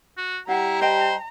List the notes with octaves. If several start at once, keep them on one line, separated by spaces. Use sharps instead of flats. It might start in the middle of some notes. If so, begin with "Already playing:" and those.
F#4
G3 E4 F#5 A#5
C5 D#5 G5 A5